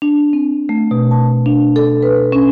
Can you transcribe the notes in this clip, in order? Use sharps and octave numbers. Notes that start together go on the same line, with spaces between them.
D4
C4
A3
B2
A5
D4
A4
B4
C#4